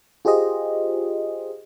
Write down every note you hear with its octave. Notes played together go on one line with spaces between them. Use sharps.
F4 G4 G#4 C5 D#5